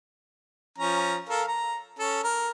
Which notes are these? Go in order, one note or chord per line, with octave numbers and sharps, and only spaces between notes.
F3 C#4 A#5
A4 A#4 F5
A#5
C#4 A4
A#4